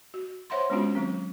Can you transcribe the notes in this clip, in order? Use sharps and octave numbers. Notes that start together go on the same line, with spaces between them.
F#4
C5 C#5 E5 F#5 B5 C6
G#3 B3 C#4 D4 F4 F#4
D#3 F#3 C4